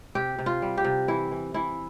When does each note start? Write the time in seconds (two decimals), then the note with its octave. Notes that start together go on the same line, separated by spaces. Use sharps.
0.15 C3 G4
0.39 C3
0.46 F4
0.62 G3
0.77 G4
0.84 C3
1.08 E3 E4
1.31 E3
1.54 E3 E4